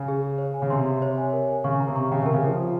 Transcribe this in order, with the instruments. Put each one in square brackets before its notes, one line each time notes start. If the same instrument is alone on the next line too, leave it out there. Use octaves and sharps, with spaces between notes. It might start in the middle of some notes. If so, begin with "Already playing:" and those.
Already playing: [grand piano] C#3
[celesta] G#4
G#4
C#5
G#5
[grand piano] C#3
[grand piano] C3 [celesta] C6
[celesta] C6
C#5
G#5
A#4
G#5
[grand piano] C#3 [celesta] C#6
[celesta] A#5
[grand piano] C3
[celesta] C#6
[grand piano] C#3 [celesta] G5
[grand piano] C3
[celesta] A#4
[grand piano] C#3
[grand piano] F3 [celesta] A#4
[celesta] F4